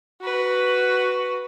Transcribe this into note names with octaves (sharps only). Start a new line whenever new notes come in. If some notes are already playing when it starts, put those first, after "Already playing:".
F#4 B4